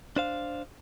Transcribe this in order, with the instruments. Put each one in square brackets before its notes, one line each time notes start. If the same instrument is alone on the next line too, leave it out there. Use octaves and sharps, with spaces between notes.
[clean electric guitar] D4 C5 F5